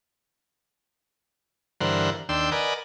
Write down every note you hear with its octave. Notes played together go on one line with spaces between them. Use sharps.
G2 D3 E3 A#4 C5 F#5
D#2 D4 G5 C6 E6
A#4 B4 D5 D#5 F#5 G#5